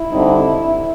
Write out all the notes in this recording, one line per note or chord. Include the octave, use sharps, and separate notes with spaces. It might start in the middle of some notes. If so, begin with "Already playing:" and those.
Already playing: E4
D3 G3 C4 D#4